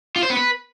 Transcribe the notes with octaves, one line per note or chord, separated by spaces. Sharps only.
F4
C5
B3
B4